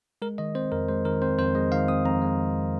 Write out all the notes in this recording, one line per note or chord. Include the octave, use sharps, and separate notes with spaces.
G#3 A#4
D#3 D#5
C4 C5
F2 A#4
G#3 C5
D#3 A#4
C4 C5
F2 C5
G#3 D#5
D#3 F5
C4 D#6
F2 A#5
G#3